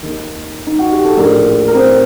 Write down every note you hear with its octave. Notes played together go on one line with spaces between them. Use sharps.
D#2 D#3
D#4
F#4
G4
A4
A#1 A2 A#3 A#4
A#4
C4 C5